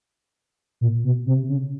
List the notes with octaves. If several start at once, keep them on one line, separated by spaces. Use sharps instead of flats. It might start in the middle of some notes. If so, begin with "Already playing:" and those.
A#2
B2
C3
C#3